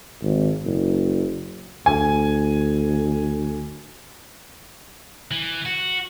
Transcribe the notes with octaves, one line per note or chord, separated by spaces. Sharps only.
G#1
F#1
D2 G#5
E3
F#4